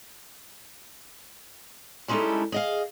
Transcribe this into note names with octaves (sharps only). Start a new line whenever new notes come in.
G3 G#3 C#4 D#4 E4 A4
G#4 D#5 F5